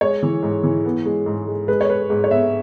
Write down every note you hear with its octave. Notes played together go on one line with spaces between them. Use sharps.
G#3 C#5
E3
G#2
E3
B3
G#3
G#2
G#3
G#3 B4
C#5
G#3 B4
G#2
C#5
B3 E5